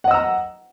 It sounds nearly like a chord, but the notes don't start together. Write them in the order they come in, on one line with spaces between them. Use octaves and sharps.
F#5 D#5 E6 A#5